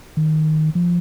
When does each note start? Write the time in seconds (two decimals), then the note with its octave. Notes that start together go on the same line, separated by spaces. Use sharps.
0.17 D#3
0.75 F3